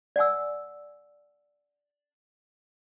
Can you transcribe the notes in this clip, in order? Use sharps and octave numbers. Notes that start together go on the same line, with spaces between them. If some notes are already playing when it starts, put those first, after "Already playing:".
D5 F#5 G#5 E6